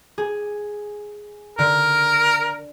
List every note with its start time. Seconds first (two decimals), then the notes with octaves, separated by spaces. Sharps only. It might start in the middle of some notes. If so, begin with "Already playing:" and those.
0.18 G#4
1.59 D3 A#4